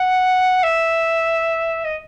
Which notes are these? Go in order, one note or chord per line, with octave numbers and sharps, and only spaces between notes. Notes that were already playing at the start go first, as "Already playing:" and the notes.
Already playing: F#5
E5
D#5